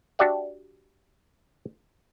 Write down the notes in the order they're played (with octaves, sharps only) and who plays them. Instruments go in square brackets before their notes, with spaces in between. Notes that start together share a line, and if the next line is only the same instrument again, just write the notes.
[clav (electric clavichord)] D4 F#4 G4 D5 E5 F#5